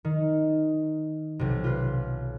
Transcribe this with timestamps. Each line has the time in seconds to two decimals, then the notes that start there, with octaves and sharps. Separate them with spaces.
0.05 D#3
1.39 B1 C3
1.64 F4 B4